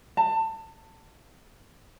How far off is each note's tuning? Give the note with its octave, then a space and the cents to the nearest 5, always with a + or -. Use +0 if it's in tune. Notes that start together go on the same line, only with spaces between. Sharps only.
A5 +25